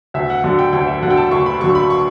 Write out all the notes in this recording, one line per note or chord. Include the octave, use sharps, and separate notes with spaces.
D2 E5
F#5
D3 F#3 F#5
G5
D2 G5
E5
D3 F#3 F#5
G5
A5
D2 C#6
B5
D3 F#3 C#6
B5
C#6